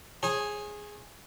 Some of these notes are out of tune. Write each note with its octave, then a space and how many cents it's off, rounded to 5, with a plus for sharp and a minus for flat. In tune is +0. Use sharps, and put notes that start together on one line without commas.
G#4 +0 C#5 -45 G#5 +0